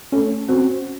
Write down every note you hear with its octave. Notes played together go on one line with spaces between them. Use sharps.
A3 C#4
C4 C#4 F#4